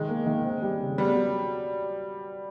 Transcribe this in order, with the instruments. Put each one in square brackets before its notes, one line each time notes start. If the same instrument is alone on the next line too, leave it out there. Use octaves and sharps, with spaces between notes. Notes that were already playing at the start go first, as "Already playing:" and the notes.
Already playing: [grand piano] D#3 [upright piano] G#3
[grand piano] A#3
D#3
C4
G3
C#3
[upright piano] G3 [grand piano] B3
[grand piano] F#3